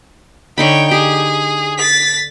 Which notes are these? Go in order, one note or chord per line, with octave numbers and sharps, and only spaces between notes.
D3 D#4 C#5 G5 B5
G4 G#4
A6 B6